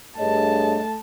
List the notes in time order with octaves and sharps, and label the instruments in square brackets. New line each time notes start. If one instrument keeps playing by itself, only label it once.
[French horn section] G2 G#4 C#5 [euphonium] A3 [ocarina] D#5 [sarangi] A5